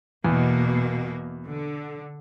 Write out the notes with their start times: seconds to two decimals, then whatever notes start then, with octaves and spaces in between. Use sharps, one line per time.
0.25 E2 B2 A#3
1.47 D3